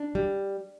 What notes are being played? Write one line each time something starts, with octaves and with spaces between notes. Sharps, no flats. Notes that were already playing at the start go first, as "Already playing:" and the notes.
Already playing: D4
G3